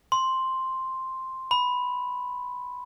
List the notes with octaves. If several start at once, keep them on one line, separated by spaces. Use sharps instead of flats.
C6
B5